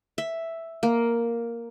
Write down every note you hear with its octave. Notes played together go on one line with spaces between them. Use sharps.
E5
A#3